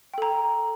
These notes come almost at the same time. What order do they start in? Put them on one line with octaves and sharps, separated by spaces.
G5 A4 A#5